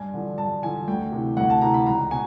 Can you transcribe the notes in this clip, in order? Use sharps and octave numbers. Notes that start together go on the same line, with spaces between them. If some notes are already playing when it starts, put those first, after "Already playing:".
Already playing: G2 G#5
D3 F3
G2 A5
D3 F3 G#5
D2 G5
C3 E3
D2 F#5
A5
C3 E3 A#5
B5
C#2 A#5
B2 G#5